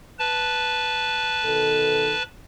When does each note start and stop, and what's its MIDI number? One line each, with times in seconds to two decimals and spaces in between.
0.19 2.23 71
0.19 2.23 81
1.44 2.13 47
1.44 2.13 51
1.44 2.13 69